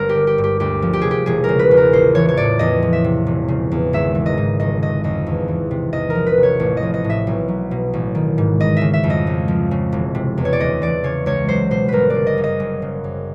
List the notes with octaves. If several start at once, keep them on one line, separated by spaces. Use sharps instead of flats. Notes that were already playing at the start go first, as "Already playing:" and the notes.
Already playing: G1 A#4
G4
D3
G4
G2
G4
D2 G4
F3
G4
C3 G#4
G4
E1 G#4
A#4
C#3
B4
E2
A#4
A#1 C5
E3 C#5
C#5
A2 D5
E2 D#5
F3
E5
C3
E1
C#3
E2
G#1 E5
E3
D#5
G#2
F1 D#5
D3 D#5
F2 D#5
E2
E3
C3
E2 D#5
A#4
F3
B4
C3
C#5
A1
D#5
F3
D#5
A2
E5
B1
F#3
B2
A1
D#3
G#2
G1 D#5
C#3 E5
E5
F2
D#5
C#2
F3
C#3
E1
C3
E2
C#5
D5
D2 D#5
E3 D5
C#3 C#5
C#2 C#5
F#3 C5
B2 C5
G1 A#4 B4
C#3 D5
D#5
F#2
D#5
F#1
C#3
F#2